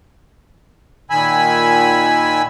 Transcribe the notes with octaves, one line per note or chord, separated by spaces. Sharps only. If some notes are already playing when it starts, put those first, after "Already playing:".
A#2 D#3 G#5 B5 E6